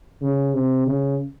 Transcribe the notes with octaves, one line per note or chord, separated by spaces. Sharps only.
C#3
C3
C#3